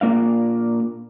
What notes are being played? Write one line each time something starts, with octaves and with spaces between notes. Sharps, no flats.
A#2 A#3 D4 F5